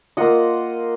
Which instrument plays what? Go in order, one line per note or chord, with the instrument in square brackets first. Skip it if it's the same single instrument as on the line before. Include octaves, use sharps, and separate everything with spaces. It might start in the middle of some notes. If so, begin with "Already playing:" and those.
[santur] A#3 F4 D#5 F#5